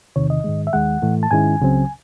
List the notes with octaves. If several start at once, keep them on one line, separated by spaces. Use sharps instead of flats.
E2 C3 D#3 C#5
D#5
G#2 D#3 G#3
E5
D#2 D#3 G#3 F#5
A2 E3 A3
A5
G#2 D#3 G#3 C#4 E4 G#5
C#2 C#3 F#3 C4